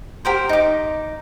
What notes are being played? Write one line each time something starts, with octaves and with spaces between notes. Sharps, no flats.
G4 A#4 C5
D#4 D6